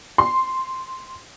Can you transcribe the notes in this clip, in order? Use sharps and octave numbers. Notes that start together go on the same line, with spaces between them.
C6